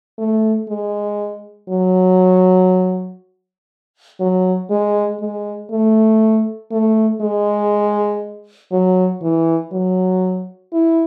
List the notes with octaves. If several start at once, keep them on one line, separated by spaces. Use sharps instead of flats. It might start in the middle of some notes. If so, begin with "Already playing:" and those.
A3
G#3
F#3
F#3
G#3
G#3
A3
A3
G#3
F#3
E3
F#3
E4